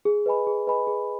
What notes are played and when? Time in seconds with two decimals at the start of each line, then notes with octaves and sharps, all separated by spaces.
0.05 G#4
0.26 B4 D#5 G#5 B5
0.47 G#4
0.67 B4 D#5 G#5 B5
0.87 G#4